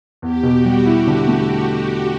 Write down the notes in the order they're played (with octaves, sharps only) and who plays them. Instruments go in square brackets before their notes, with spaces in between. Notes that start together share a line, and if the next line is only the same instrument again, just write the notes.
[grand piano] E2 [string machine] G4
[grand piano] B2
[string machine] F#4
[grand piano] G3
[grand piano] E4 [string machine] F#4
[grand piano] D3
A3